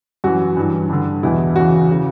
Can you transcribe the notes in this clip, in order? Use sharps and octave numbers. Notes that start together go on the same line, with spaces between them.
F#2 E3 F#4
G2 E3
G2 D3
E2 B2 E4
E2 C#3 E3 F#4
C#3 E3